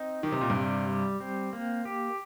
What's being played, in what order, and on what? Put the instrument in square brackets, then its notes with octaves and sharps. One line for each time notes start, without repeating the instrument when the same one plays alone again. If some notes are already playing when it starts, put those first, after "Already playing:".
Already playing: [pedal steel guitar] C4 D#4
[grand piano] D#3 [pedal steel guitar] G4
[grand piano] C3
A#2
G2 C3
[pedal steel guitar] G3
G3
C4
A#3
G4